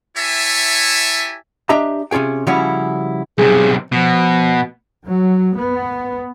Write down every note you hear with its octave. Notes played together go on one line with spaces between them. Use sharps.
E4 G4 C#5 E5 G#5 A5
D4 G4 D#5 E5 A#5
C3 C#4 F4 G#4 G5
C#3 F3 G3 C#4 E4 F#4
B1 C3 G#4
B2 F3
F#3
B3